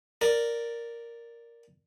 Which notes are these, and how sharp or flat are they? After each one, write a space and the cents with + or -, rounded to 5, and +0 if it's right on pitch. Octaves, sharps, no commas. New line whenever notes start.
A#4 +0 D5 +0